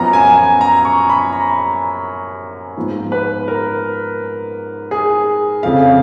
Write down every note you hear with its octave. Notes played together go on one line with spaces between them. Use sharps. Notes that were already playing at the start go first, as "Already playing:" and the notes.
Already playing: F#2 F3 B3 A#5
G#5
G#5
A#5
C#6
B5
A#5
G#2 F3 B3
B4
A#4
G#4
F1 F2 C#3 F5